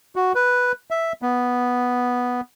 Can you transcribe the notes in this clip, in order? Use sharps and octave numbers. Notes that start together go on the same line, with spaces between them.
F#4
B4
E5
B3